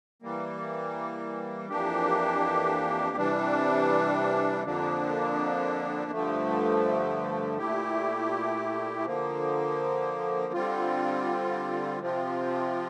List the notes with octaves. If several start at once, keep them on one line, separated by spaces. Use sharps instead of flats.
E3 G3 A#3
F2 E3 A#3 D4 G4
C3 E3 G3 D4
F2 D3 F3 A#3 D4
G2 D3 F3 A3
A#2 A3 E4 G4
D3 F3 A#3
D3 G3 C4 F4
C3 F3 C4 F4